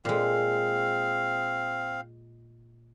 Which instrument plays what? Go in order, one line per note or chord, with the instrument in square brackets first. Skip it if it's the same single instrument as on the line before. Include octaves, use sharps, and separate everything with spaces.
[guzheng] A#2 G#3 [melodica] C4 F5